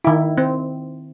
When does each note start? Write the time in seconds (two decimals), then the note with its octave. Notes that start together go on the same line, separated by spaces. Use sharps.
0.04 D#3 E4
0.38 C4